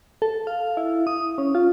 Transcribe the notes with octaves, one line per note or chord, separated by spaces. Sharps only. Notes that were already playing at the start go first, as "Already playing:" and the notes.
A4
F5
E4
D#6
C#4
F4